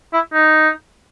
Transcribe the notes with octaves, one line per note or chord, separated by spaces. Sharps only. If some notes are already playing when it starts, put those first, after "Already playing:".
E4
D#4